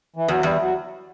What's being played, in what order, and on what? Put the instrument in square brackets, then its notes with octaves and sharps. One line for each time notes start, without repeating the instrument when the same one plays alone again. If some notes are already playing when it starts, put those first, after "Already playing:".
[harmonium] E3
[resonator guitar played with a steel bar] E2 [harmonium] F#3
[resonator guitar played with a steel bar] E2 [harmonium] G3
[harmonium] F#3